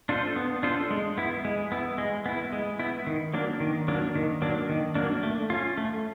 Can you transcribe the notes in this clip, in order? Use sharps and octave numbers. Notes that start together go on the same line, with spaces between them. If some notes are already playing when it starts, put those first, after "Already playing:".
D4 F4 A4 C5
B3
D4 F4 A4 C5
G#3
B3 E4
G#3
B3 E4
G#3
B3 E4
G#3
B3 E4
D#3
F#3 A#3 D4
D#3
F#3 A#3 D4
D#3
F#3 A#3 D4
D#3
F#3 A#3 D4
A3
C#4 F4
A3